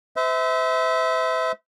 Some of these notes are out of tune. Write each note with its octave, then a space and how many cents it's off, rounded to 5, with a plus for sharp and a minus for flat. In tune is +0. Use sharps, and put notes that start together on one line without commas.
C5 -40 E5 -25